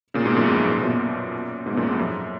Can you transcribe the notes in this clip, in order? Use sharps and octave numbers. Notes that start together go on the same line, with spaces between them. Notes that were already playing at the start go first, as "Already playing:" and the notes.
A#2 C#3
G#2 B2
F#2 A#2
F2 G#2
A#2
B2
F#2 A#2
G#2 B2
F#2 A#2
F2 G#2
F#2